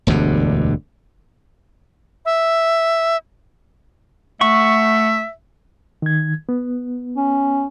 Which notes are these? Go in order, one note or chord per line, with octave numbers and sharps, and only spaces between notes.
E1 D2 G2 D3
E5
A3 E5 F#5 C#6
D#3 G#6
B3
C#4